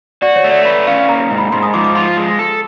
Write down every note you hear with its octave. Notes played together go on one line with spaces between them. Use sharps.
F#4 D5
C#5
A3
D5
B4
C#4 F5
A#3 A#5
G#2
B5
G#2 C6
D#6
F3 D6
D6
F4 C6
G#3
A4